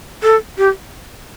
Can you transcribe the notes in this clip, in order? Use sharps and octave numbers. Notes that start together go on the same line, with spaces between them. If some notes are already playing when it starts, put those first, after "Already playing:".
A4
G4